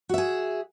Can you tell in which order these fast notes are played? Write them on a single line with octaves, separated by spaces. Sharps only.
F#4 E5 G#4